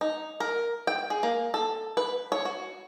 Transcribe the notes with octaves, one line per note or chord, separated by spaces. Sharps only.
D#4
A#4
G5
G#4
A#3
A4
B4
C#5
F#4